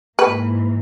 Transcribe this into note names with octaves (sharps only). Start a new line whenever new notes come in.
G#2 E3 A#3 B4